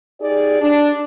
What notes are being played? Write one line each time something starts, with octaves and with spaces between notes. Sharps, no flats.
D#4 G4 G#4 D5
D4